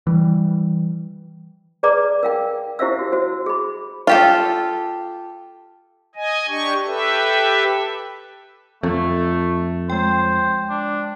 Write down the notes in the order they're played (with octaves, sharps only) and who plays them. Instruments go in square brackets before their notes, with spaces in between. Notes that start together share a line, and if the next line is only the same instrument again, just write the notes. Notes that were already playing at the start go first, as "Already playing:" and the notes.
[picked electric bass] E3 G3
[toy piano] G#4 B4 D5 A#5 D6
A#4 F5 G5
E4 G4 C5 E5 F5 E6
F#4
F#4 C5
G#4 B5
[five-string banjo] F4 G4 A4
[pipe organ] D#5 G#5
D4 G4 C#6
G4 A4 B4 E5
[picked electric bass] F2 [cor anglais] A3 [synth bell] F4
[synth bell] G#3 G5 [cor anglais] C5
[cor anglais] D4